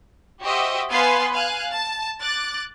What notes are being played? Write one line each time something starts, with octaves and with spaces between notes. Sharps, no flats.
F#4 G4 C5 D#5 E5
B3 B4 F5 G#5 C6 C7
F5 G#5 F#6
A5
D6 F#6 A6